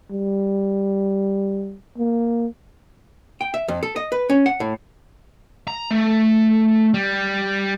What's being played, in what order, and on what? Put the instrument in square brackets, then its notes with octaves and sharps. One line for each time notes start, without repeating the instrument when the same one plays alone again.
[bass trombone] G3
A#3
[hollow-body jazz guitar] G5
E5
F2
A4
D#5
B4
C#4
F#5
A2
[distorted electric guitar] A#5
A3
G3